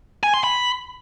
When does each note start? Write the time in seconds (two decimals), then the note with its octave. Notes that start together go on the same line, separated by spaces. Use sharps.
0.23 G#5
0.34 C6
0.44 B5